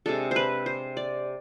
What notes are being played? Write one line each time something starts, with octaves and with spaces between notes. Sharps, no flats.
C3 G#3 D4 A4
B4 C5
C5
D5